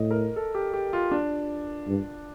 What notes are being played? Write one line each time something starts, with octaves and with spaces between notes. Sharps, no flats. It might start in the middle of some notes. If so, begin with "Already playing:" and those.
Already playing: A2 D#5
A#4
A4
G4
G4
F4
D4
G2